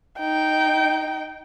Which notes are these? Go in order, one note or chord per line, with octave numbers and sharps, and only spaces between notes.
D#4 G5